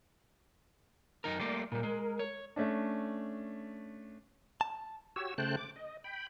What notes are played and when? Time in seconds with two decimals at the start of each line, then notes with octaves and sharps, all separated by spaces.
1.24 F#2 D#4 A#4
1.39 G3 A3 A#3 D5 C6 D6
1.72 A#2 G3 A#4
1.83 G#3
2.19 C#5
2.56 A3 C#4 D4
4.61 A5
5.16 F#4 G4 C#5 E6
5.38 C#3 A3 C5 G5 A5 F#6
5.57 D6
5.76 D#5
6.04 G5 B5